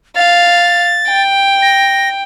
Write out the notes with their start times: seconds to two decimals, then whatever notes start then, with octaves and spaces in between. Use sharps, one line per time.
0.16 F5 A6
1.08 G5
1.62 A#6